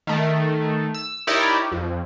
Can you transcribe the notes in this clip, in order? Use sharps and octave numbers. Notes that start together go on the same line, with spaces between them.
D#3 A3
E6
D#4 E4 G4 A#4 C#5 D5
F2